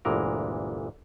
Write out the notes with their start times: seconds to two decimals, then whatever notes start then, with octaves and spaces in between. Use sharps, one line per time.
0.05 G1 D2 A#2 E3 G#3 A#4